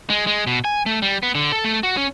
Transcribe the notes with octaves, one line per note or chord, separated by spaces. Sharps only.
G#3
G#3
B2
G#5
A3
G3
B3
D3
A4
A3
F#4
C#4